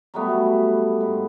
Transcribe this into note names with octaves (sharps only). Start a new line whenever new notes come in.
F#3 G3 A3 B3
G#2